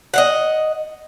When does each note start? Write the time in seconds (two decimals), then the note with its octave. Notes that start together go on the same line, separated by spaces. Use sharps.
0.14 D#5 F5 F#5